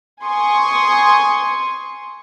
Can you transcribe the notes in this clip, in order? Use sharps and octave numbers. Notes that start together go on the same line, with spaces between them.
G#5 C6 C#6 D#6